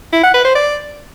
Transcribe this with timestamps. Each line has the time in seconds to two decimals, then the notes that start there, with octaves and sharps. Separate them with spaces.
0.13 E4
0.23 F#5
0.34 B4
0.45 C5
0.55 D5